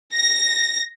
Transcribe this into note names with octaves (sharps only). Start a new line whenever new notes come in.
A#6